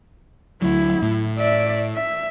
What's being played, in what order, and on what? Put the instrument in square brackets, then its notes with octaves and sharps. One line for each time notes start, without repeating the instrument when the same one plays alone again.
[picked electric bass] D2 F#3 [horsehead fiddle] E4
[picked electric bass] A2
[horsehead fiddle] D5 E5
E5